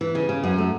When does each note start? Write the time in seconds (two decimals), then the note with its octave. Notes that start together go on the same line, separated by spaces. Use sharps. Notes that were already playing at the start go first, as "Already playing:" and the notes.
0.01 E3
0.15 C#3
0.29 C#3
0.43 F#2
0.58 A3